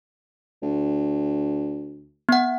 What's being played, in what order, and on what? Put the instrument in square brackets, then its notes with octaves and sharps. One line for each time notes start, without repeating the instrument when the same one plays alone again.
[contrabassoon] D2
[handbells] B3 F#5